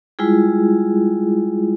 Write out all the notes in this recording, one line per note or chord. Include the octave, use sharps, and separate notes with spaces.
G3 G#3 E4 F4 G#4